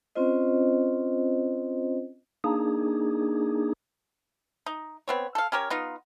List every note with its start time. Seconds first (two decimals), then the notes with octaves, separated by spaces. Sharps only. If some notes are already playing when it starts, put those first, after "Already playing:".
0.15 C4 C#4 F4 C5 D#5
2.44 A#3 D4 D#4 G#4
4.66 D#4
5.08 B3 C4 C#5
5.35 A4 F5
5.52 C#4 G4 A#4 C#5
5.70 B3 D#4 F4